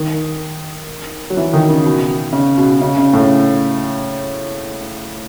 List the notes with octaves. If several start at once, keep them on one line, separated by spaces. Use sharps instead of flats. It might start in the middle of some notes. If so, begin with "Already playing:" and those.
Already playing: D#3
F#3
E3
D#3
C#3
B2
C#3
B2
C#3
C#3
A2